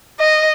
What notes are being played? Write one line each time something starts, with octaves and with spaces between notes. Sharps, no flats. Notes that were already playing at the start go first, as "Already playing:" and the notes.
D#5